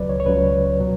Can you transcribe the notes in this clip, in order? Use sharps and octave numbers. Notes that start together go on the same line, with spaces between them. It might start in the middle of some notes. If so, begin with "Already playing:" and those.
Already playing: C#2 C#3 F#3 B4 D5
C#5
C#5
C#2 C#3 F#3 B4
B2 F#3